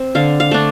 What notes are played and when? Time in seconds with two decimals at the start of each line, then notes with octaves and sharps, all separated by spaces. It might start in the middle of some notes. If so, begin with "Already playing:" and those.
Already playing: C4
0.15 D3 F5
0.40 F5
0.51 A3 D4